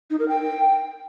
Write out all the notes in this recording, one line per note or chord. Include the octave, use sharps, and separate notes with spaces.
D#4
A#4
G5